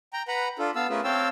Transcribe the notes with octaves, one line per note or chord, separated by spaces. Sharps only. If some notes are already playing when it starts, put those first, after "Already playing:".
G5 A#5
B4 F#5 A#5 B5
D4 F4 A4
B3 F5 A5 E6
A3 C#4 F4 G#4 A#4 B4
C4 C#5 F5 G5 A5 E6